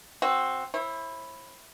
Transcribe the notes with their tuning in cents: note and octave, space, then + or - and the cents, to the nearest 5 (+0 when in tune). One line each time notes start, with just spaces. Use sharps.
C4 +10 F#4 +0
E4 +0 C5 +45